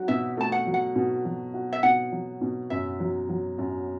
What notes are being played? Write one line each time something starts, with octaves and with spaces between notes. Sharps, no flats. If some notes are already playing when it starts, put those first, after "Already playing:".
Already playing: F#3 F#4
B2 E5
A3 A5
F#5
F#3
F#5
B2
F#3
F#4
E5
B2 F#5
F#3
B2
F#2 E5
F#3
F#3
F#2